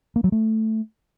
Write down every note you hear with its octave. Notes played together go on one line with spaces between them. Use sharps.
A#3
F#3
A3